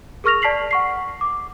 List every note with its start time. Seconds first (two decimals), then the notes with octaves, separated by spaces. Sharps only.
0.24 G#4 A#4 C#6 F6 A#6 F7
0.42 D5 A5 F6 B6 C7 F#7
0.71 F#5 C#6 C7
1.21 D6